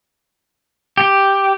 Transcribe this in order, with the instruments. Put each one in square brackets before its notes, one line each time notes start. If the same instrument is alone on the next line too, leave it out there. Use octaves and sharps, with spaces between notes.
[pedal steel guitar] G4